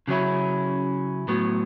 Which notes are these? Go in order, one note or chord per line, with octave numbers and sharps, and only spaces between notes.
C#3 F#3 C#4 E4
A2 F#3 B3